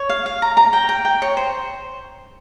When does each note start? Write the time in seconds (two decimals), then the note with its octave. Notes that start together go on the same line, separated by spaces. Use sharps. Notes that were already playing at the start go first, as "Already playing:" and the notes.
Already playing: C#5
0.09 F5
0.26 F5
0.42 A#5
0.57 A#5
0.73 G5
0.89 G5
1.05 G5
1.22 C#5
1.37 C5